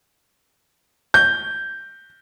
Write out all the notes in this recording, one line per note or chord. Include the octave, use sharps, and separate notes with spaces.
G6